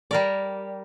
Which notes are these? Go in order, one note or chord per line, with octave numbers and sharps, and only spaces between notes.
G3 A#4 D5